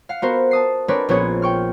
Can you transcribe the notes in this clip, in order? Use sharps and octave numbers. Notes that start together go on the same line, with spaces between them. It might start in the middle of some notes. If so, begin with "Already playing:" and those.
F5 F#5
B3 F#4 A#4 C5
A5 D#6 C7
C4 D4 A#4 B4 C#5 D5
A#1 B3 C#4 G#4 C#5
G5 C#6 F6